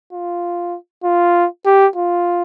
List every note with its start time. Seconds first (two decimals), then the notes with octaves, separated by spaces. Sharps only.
0.13 F4
1.04 F4
1.66 G4
1.96 F4